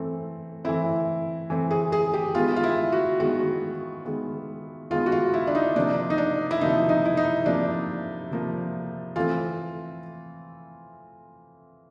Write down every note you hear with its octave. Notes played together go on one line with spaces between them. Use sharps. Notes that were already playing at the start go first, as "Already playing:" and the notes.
Already playing: E3 A3 C4
E3 A3 C4 E4
E3 A3 C4
G#4
G#4
G4
D#3 G#3 B3 F4
F4
E4
F#4
D#3 G#3 B3 F#4
D#3 G#3 B3
D#3 G#3 B3 F4
F#4
F4
E4
D4
D#4
C3 F3 A#3 D4
D#4
D4
E4
C3 F3 A#3 D#4
D#4
E4
D#4
C3 F3 A#3 D4
C3 F3 A#3
E3 A3 C4 F4